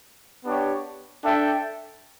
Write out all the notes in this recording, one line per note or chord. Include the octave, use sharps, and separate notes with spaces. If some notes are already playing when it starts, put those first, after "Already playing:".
B3 D4 G4 C#5
D4 A4 E5 G5